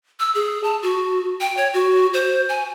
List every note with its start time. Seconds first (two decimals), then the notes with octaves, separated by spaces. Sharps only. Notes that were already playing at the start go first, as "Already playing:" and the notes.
0.20 E6
0.35 G#4
0.64 A5
0.82 F#4
1.41 G5
1.57 C#5
1.74 F#4
2.14 C5
2.49 G#5